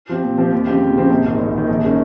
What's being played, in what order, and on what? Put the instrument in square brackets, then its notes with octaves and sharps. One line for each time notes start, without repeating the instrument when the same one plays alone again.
[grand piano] F3 C4 G4
A#2
F3 C4 G4
D#2
C#3 F3 C4 G4
D#2
C#3 F3 C4 G4
A#1
G#2 D#3
A#1
G#2 D#3
A#1
D#3 G#3 C#4